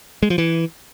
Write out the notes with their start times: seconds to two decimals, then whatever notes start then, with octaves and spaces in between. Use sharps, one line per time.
0.23 G#3
0.30 F3
0.38 E3